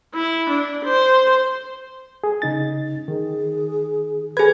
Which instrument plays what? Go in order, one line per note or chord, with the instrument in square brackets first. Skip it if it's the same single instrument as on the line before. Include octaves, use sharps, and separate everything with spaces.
[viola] E4
D4
C5
[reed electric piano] G#4
C#3 D#4 A6
[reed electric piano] D#3 [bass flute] G#4
[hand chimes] G#4 G#6 [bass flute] A4 [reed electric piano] B4 G#5